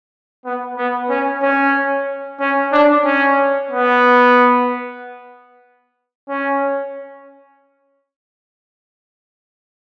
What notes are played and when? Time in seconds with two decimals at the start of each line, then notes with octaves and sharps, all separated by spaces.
0.45 B3
0.77 B3
1.10 C#4
1.42 C#4
2.40 C#4
2.72 D4
3.05 C#4
3.70 B3
6.29 C#4